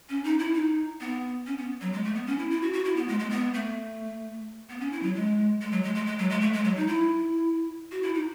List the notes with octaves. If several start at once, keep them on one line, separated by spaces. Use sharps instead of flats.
C#4
D#4
E4
D#4
B3
C#4
B3
F#3
G#3
A3
B3
C#4
E4
E4
F#4
F#4
E4
B3
G#3
G#3
B3
A3
B3
C#4
E4
F#3
G#3
G#3
F#3
G#3
G#3
G#3
F#3
G#3
A3
G#3
F#3
D#4
E4
F#4
E4
D#4